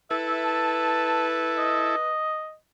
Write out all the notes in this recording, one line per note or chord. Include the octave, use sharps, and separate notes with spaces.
E4 A4 B4 E5
A5
D#5